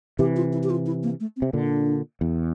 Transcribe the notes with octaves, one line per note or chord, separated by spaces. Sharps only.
C3 E3 G4
F4
E4
G4
F4
E4
A#3
A3
C4
C3
A#2 D3 D4
E2